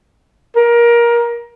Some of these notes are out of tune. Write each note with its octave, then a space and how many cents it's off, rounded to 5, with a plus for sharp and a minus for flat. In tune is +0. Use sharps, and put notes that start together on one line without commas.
A#4 +20